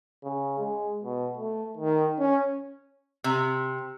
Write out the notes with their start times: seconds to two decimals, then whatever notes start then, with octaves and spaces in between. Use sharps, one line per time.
0.24 C#3
0.59 G#3
1.04 B2
1.37 A3
1.77 D#3
2.19 C#4
3.24 C3